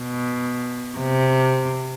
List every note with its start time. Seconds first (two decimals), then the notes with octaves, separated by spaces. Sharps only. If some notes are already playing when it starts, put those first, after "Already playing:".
Already playing: B2
0.99 C3